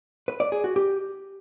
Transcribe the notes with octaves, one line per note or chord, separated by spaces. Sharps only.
B4
D5
G#4
F#4
G4